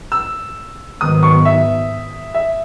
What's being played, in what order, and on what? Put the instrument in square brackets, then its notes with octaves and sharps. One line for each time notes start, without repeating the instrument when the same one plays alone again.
[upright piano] E6
[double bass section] G#2 D#3 F#3 B3 [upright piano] D#6
[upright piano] C#6
E5
E5